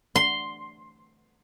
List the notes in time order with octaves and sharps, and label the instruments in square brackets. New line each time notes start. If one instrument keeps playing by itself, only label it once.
[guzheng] C6